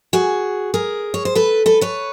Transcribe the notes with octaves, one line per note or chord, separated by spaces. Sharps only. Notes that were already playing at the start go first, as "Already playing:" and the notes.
F#4 G#4
G#4 A#4
C#5
C5
A4 B4
A4 B4
B4 C#5